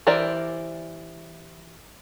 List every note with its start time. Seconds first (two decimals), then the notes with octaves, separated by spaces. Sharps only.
0.07 E3 G4 A#4 C5 D5